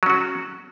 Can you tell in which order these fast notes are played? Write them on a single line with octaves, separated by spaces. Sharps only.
F#3 C#4 F#4